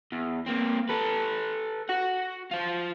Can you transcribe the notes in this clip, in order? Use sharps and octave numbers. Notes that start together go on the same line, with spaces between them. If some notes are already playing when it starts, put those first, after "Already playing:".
E2
A#3 C4
A4 B4
F#4 F#5
F4 C5